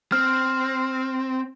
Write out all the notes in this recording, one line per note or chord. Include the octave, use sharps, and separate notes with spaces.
C4 F6